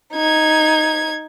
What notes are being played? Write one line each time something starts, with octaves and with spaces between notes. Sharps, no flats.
D#4 G#6